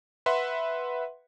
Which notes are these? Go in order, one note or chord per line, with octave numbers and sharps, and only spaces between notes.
B4 E5 F#5 C6